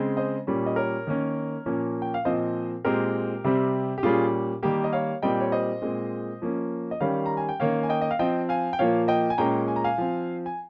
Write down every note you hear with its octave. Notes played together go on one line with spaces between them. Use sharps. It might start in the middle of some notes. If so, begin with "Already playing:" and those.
Already playing: C#3 G#3 C4
C5 D#5
A#2 G3 C#4
D#5
A#4 C#5
D#3 A#3 C#4
A#2 F3 A#3 C#4
G5
F5
A#2 F3 C4 C5 D#5
A#2 G#3 C4 G4 A#4
C3 G3 C4
G4
A#2 G3 C#4 F4 G#4
D#3 G3 A#3 G4
D#5
C#5 F5
A#2 G3 C4 D#5 G5
C#5
C5 D#5
A#2 G#3 C4
F3 A#3 C#4
D#5
D#3 G3 C#4 C#5 F5
A#5
G#5
G5
D#3 A#3 C#4 C#5 F5
G#5
D#5 G5
D#5
F5
F3 C4 D#5 G5
F5 G#5
G5
A#2 F3 A#3 C#5 F5
D#5 G5
G#5
A#2 G#3 C#4 G5 A#5
G#5
A#5
F5 G#5
F3 C4
G#5